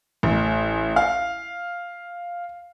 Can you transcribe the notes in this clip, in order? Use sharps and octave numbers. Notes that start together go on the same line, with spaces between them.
A1
F5